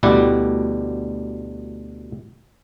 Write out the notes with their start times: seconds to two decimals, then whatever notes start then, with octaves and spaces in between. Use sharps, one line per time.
0.03 D2 B2 G3 E4 D5 F#5